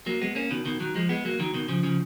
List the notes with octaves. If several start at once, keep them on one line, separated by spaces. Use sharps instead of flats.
F#3 A#3
G#3 B3
A#3 C#4
B2 D#3
B2 D#3
D#3 F#3
F3 G#3
G#3 B3
F#3 A#3
D#3 F#3
B2 D#3
C#3 F3
C#3 F3